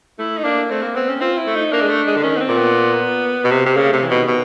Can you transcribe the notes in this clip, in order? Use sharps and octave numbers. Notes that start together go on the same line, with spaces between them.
A3 E4
D#4
A#3 D4
A3 C4
A#3
B3 C4
C#4
C4 F4
E4
A3
D#4
A#3 D4
G#3
A3
G#3
D3
D#3 C#4
B3
C4
A#2
B3
B2
C3
C3
C#3 A#3
C3 A3
E3
B2 D#3
B2 D#3